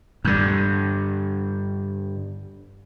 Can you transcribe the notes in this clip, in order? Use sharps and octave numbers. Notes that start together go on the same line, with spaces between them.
G2 D3